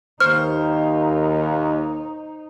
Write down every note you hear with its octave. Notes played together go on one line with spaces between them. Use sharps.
D#2 D#4 C5 C#6 F6